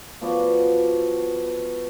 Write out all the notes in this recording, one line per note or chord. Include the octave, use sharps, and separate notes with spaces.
F3 B3 F#4 D5